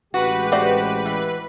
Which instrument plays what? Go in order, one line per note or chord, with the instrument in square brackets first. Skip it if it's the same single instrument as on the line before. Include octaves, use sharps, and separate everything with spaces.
[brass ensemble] A1 G#3 G4 [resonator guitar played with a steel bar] F#4 [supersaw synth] B4
[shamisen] A3 D5 D#5 [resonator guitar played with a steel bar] C4 F#4
[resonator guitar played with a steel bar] E3